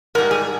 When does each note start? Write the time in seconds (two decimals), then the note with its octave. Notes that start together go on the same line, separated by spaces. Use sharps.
0.15 G#2 A#4
0.18 G3
0.31 G#4